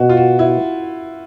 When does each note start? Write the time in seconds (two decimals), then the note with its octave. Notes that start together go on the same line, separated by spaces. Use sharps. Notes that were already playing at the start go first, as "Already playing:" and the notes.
Already playing: B2 F#4
0.09 F4
0.17 F#4
0.39 E4